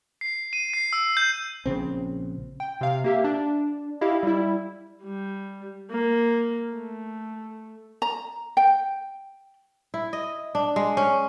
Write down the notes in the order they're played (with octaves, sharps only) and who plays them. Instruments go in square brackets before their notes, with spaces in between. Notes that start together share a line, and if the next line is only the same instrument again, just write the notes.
[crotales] C7
D#7
C7
E6
G6
[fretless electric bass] A#1 C#3 C4
[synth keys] G5
C3 F5
A#3 G4 E5
D4
E4 G4 D#5 F5
G3 E4
[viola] G3
A#3
A3
[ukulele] A#5
G5
[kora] E4
D#5
D4
G#3
C#4